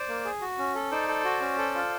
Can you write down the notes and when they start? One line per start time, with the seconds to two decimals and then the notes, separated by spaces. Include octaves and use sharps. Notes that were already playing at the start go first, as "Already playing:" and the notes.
Already playing: C5 D5
0.08 A#3
0.25 G#4
0.42 F#4
0.59 C#4
0.75 A4
0.91 D#4 C5 D5
1.09 A4
1.25 F#4
1.41 C#4
1.58 A4
1.75 F4